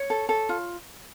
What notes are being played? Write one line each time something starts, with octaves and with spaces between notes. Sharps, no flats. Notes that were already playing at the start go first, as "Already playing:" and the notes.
Already playing: C#5
A4
A4
F4